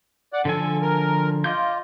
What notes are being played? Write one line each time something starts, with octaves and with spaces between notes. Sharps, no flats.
D5 F#5
D3 F3 A4 G#5
A#4
F4 D#5 D6 G6